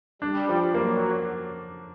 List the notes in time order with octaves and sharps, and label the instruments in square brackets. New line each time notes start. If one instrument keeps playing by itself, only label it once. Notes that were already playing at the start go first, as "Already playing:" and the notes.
[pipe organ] G3 [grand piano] D4
[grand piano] F3
[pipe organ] F#3 [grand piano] A#3